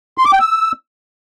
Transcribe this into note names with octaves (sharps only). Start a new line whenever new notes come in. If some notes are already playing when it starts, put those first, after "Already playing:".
C6
D6
G5
E6